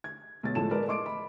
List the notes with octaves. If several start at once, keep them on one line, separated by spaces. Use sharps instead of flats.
G#6
B1 A6
A2 F3 G#3 A4 A5 E7
G#3 A#4 B4 D5
D#5 C6 D6 D7
B5